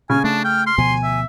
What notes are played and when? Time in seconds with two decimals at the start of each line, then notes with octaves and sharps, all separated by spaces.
0.10 C#3 G#5 F6
0.24 A3 D4 A5
0.44 G5 F6
0.66 C6 F6
0.78 D2 B2 F3 G#5
1.03 E5